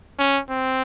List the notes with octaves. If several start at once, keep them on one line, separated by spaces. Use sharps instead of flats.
C#4
C4